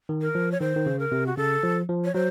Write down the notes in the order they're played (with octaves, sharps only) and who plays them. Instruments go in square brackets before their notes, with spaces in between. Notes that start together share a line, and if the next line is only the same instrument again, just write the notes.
[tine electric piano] D#3
[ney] A#4
[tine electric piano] F3
[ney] C#5
[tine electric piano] D#3 [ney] C5
[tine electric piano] D#3
C#3
[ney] A#4
[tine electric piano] C3
[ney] F#4
[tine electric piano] C#3 [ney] A4
[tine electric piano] F3
F3
[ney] C#5
[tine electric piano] F#3 [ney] C5